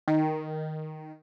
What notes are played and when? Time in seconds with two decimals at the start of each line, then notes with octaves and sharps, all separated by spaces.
0.08 D#3